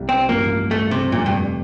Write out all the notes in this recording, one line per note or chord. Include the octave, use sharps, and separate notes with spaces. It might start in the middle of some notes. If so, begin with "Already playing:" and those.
Already playing: C2 C3 G3
C4
A1 G2 F3 A#3
A3
C3
F1 F2 A#2 D3 G3
G2